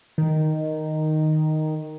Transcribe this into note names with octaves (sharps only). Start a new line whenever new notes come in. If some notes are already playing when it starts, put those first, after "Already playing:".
D#3